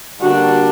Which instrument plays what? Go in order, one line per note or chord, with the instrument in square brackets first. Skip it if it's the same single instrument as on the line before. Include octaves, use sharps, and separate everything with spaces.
[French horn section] D3 G3 A#3 D4 [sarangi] F#4